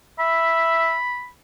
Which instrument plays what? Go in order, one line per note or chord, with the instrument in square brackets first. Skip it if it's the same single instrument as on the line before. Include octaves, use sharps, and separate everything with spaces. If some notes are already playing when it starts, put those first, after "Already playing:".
[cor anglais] E5 [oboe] B5